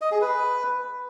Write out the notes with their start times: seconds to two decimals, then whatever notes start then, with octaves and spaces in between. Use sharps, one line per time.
0.01 D#5
0.11 G#4
0.21 B4